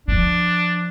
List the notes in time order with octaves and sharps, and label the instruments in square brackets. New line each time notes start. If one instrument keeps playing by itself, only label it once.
[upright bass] F3 [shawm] D4